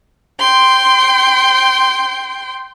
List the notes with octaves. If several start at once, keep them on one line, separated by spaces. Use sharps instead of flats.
G5 C6